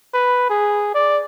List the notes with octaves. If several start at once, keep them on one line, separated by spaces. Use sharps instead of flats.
B4
G#4
D5